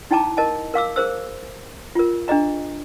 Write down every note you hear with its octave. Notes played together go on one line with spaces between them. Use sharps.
D#4 E4 G5 A5 A#5 D6
A#4 D#5 A5
A#4 F5 D6 E6
G#4 A#4 C5 E6
F4 A#4
D4 G#4 D#5 A#5